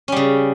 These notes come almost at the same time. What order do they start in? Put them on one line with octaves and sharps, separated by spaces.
C#4 G3 C#3